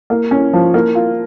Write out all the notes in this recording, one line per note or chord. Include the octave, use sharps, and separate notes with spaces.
A#3
C#4
F3
A#3
F4